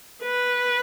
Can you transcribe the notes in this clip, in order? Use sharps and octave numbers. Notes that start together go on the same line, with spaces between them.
B4